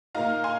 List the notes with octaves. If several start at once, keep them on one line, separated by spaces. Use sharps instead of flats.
A#2 A#3 D#4 F5 A#5
G#5 C6